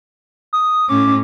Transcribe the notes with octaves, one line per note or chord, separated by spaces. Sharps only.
D#6
A2 C#4 D6